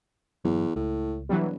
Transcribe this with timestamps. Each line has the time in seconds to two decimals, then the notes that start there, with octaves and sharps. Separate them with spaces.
0.45 G1 E2 F#3
0.76 C#2 A2
1.29 E1 E3 F#3 G3